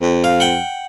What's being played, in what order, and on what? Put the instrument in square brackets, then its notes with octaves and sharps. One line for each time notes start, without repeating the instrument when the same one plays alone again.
[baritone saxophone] F2
[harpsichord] F5
F#5 G5